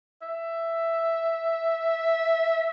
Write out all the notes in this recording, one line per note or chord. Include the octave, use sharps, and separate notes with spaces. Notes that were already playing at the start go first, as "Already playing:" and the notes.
E5